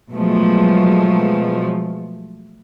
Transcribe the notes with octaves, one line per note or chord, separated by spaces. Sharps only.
B2 F3 F#3 G#3 A3